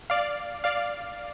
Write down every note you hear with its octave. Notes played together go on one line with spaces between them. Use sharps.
D5 F5
D5 F5